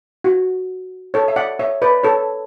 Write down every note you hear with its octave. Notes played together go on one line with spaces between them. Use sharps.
F#4
A4 C#5
E5
D5 F#5
C#5 E5
B4 D5
A4 C#5